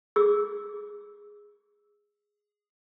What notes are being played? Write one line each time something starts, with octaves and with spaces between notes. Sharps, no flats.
G#4 D6 E6